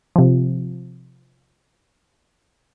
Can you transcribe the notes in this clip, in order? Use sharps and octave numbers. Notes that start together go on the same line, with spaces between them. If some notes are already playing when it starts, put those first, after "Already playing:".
C3 F3